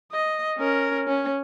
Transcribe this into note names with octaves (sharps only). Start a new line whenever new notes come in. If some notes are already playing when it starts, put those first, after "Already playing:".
D#5
C#4 A#4
C#4